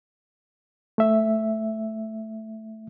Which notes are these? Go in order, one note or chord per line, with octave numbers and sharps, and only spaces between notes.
A3 E5